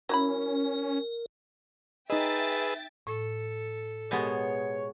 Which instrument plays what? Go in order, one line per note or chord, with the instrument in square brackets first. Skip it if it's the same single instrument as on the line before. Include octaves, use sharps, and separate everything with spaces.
[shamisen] F#3 E4 B5 [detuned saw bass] C#4 [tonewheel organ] A#4
[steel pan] D#4 D#5 [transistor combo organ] G#4 B4 E6 [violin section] E5 G5 A6
[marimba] A2 [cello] A4
[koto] B2 G#3 B3 [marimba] G4 A#4 [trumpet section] C#5